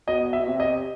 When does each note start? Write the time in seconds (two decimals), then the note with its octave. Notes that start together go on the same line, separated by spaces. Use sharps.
0.08 B2 D#5
0.33 E5
0.39 B2
0.47 C3
0.60 D#5